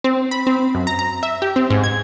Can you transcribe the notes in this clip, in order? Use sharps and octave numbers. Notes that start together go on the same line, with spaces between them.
C4
B5
C4
F#2
A#5
A#5
E5
G4
C4
G#2
G#6